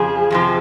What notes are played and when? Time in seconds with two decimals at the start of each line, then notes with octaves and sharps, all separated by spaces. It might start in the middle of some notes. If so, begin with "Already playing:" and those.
Already playing: F2 C#3 F3 G#4
0.31 F2 C3 F3